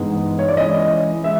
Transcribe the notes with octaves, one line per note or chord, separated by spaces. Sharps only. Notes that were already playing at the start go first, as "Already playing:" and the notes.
Already playing: G2 E3 G#3 B3 D#4
C#5
D5
E3 G#3 C#4 E4 D#5
E3 G#3 E5